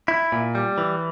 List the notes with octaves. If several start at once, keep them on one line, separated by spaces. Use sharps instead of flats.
E4
A#2
G3
E3